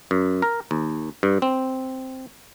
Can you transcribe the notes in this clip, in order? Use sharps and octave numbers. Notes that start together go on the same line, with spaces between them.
F#2
A#4
D#2
G2
C4